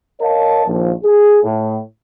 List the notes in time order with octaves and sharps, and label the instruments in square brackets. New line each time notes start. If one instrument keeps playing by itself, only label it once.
[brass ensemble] A#4 C#5 D#5 F5 A5
A#1 D#2 F3
G#4
A2